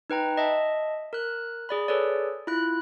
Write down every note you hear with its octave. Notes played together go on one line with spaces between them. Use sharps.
D#4 B4 G5 A#5
D#5 E5 A5
A#4 F#6
G#4 D5 B5
G#4 A4 B4 C#5 D5
E4 F4 B5 F#6